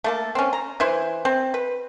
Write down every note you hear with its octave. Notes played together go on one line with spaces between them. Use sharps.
A3 A#3 A4
C4 C#4
A#5
E3 E4 C5
C4
B4